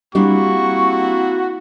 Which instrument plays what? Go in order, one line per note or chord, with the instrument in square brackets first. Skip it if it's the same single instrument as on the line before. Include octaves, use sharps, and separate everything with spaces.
[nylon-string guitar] G3 D4 [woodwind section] A#3 C4 E4 [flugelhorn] F#4 [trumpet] C#6